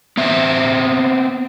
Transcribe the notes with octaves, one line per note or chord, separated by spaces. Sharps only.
B3 C4 E5